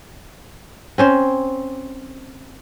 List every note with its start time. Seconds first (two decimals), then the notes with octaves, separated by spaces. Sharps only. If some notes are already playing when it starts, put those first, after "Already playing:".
0.98 C4 C#4 C5